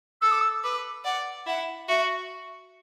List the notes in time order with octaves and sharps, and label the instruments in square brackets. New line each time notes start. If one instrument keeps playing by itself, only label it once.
[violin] A4 [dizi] E6
[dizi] D6
E6
[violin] B4 [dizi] D6
[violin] D5 [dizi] F#5
[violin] E4 [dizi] F#5
[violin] F#4 [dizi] E5